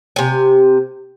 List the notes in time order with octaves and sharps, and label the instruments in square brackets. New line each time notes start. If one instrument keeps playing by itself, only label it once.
[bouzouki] C3 G#5